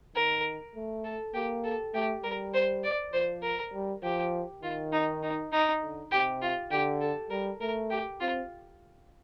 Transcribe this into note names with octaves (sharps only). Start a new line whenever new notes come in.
D#3 A#4
A3
A4
A#3 G4
A4
A3 G4
G3 A#4
C5
D5
F3 C5
A#4
G3
F3 G4
D#3 F4
D#4
D#4
D#4
D3
C3 G4
F4
D3 G4
A4
G3 A#4
A3 A#4
G4
C4 F4